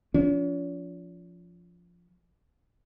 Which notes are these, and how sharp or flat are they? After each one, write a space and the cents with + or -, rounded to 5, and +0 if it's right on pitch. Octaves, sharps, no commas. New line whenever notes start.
F3 +0 C#4 +45